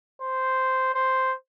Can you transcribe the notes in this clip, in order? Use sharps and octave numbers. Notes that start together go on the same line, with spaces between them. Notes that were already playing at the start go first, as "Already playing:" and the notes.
C5
C5